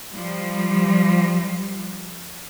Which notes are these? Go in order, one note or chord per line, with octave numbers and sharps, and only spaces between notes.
F3 G3